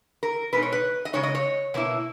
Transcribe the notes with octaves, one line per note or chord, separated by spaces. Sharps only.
A#4
B2 G#3 D#4 B4
C#5
B4
D#5
C#3 G#3 D#4 C#5
D#5
C#5
B2 A#3 E4